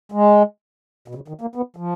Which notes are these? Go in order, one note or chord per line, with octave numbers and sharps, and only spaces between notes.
G#3
B2
C#3
D#3
A#3
B3
F3